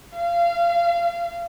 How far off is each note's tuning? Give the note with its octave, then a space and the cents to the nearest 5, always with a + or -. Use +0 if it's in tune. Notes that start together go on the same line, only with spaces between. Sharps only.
F5 -25